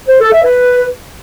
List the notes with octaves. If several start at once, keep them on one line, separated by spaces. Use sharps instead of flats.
C5
A4
E5
B4